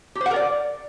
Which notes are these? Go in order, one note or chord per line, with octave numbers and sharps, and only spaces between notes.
G4
C5
F#5
A#4
D5